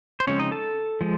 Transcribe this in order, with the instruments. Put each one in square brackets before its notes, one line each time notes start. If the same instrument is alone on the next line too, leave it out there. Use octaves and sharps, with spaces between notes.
[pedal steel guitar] C5
C#3 F3 G#3 C4 C#4 C#5
D#4 D#5
A4 A5
F3 G#3